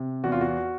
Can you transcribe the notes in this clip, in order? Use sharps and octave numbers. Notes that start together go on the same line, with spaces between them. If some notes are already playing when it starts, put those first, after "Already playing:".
Already playing: C3
E2 F#4
F4
F#4